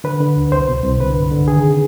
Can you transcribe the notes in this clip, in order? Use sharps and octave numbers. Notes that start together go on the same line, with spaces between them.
D3 B4
D3
D2
C2 C5
B2
C2
D3 B4
G2
D3
D#3 G#4
C3